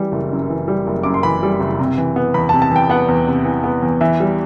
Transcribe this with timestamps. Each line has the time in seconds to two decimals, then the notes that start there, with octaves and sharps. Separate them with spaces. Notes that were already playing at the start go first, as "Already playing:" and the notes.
Already playing: E3 G3
0.12 F#1
0.32 F#2
0.50 E3
0.68 G3
0.87 F#1
1.03 F#2 D6
1.14 C6
1.23 E3 B5
1.43 G3
1.60 F#1
1.79 C3
1.98 E3
2.16 B3
2.34 E2 B5
2.49 A5
2.53 C3
2.62 A5
2.71 E3 G5
2.90 B3 F#5
3.09 E2
3.27 C3
3.45 E3
3.64 B3
3.82 E2
4.01 E3 E5
4.20 G3